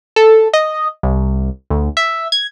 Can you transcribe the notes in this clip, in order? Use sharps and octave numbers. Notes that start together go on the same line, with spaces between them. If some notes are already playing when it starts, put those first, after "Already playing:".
A4
D#5
C2
D2
E5
G#6